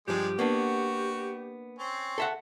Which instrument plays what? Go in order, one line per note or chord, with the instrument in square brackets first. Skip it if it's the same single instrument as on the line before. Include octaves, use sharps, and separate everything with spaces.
[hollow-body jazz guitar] G2 F3 [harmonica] G#3 D4 [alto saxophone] G4
[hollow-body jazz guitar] A#3 B3 D4 [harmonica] F#4
[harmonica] C4 C#4
[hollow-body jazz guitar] A4 E5 F#5